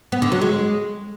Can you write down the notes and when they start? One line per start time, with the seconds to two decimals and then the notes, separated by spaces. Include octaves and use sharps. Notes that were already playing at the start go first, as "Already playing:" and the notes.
0.12 B3
0.22 D3
0.32 F#3
0.41 G#3